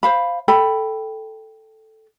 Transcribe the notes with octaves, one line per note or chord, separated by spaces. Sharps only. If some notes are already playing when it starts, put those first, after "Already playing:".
C5 F5 B5
A4 G5 B5